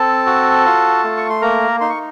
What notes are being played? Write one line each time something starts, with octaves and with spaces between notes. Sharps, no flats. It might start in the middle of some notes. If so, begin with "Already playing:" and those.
Already playing: C4 A4 A5
F#4
F4
A3
C#6
C6
A#3 A#4 A#5
D#4 C6
C#6